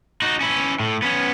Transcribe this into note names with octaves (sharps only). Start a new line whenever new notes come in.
D#4 F#4
C#4 E4
A2
B3 C#4